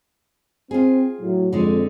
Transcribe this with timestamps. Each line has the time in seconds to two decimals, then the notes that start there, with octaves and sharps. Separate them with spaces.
0.71 C4 F4 G#4
1.21 A2 F#3
1.53 F2 D3 G#3